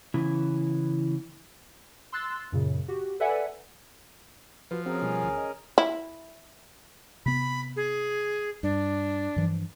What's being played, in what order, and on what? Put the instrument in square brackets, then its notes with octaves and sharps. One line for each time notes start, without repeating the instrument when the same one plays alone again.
[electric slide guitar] C#3 E3 B3 C#4 E4
[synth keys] C6 E6 F#6 A6
F#2 A#2 C#3
F#4 G4
A4 B4 D5 E5 F#5 G#5
[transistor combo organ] F3 [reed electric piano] F#4 B4
[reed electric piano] C4 F4 F#4 [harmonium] C#4 G#4 A#4
[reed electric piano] B2 G3
D2
D#5
[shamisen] E4
[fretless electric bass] C3 B3 [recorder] B5
[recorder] G#4
[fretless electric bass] G2 [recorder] D4
[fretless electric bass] G2 E3 F3